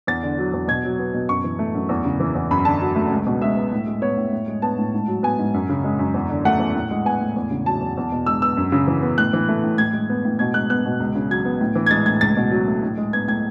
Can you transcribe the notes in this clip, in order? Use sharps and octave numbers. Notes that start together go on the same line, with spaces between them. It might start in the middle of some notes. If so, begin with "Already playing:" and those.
E2 A6
D3
F#3
E2
B2 G#6
F#3
B3
B2
F#2 C#6
E3
A3
F#2
E2
C#3
E3
E2
F#2 B5
D3 A5
F#3
A3
C#2
B2
G#3 E5
B3
A2
G#3
B3 C#5
A2
A2
G#3
B3 A5
A2
G#2
F#3
B3 G#5
G#2
F#2
C#3
G#3
F#2
E2
D3
A3 F#5
E2
A2
G#3
B3 G#5
A2
E2
C#3
F#3 A5
E2
E2
B2
G#3 E6
B3 E6
F#2
C#3
E3
B3
A2 F#6
E3
A3
A2
A2 G#6
G#3
B3
A2
B2 G#6
G#3 F#6
B3 F#6
B2
C#2
C#3
F#3 G#6
B3
A2
E3
G#6
G#3 A6
A2 G#6
C#2 A6
B2
F#3
A3
A2
G#3
B3 G#6
A2 G#6